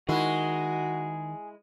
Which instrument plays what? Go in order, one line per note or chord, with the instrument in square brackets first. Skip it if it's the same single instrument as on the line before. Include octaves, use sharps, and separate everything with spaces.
[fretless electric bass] D#3 [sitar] G#3 E4 [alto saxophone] F#4 [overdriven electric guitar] G#4